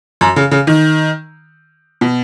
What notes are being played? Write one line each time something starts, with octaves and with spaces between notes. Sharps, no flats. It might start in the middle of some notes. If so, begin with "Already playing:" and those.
F#2
C#3
C#3
D#3
B2